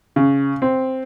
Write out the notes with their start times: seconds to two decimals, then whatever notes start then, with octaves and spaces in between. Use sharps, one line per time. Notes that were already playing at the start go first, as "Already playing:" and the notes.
0.16 C#3
0.62 C4